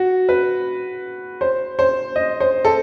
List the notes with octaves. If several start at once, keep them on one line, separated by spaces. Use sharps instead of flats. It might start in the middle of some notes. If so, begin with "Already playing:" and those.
Already playing: F#4
B4
C5
C5
D#5
C5
A4